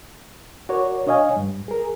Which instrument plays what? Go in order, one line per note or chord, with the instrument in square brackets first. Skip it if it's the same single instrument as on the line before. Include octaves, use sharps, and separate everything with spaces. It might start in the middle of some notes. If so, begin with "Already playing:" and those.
[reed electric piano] F#4 A#4 C#5 D5
D4 C#5 D#5 F5 G#5
G2
G#4 A#4